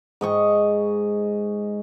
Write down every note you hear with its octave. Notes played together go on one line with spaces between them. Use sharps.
G#2 D#5 C#6